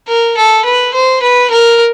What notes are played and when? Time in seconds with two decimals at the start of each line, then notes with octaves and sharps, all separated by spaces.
0.08 A#4
0.38 A4
0.65 B4
0.94 C5
1.22 B4
1.51 A#4